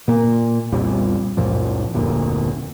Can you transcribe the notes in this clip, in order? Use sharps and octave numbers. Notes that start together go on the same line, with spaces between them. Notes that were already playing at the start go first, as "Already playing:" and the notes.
A#2 A#3
C2 F2 A#2 G3
C#2 F#2 A#2 F3
F1 D2 A#2